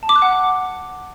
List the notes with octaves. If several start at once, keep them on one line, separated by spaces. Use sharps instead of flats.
A5
D6
F#6
F#5